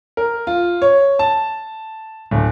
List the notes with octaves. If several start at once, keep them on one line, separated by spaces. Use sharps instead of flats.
A#4
F4
C#5
A5
D1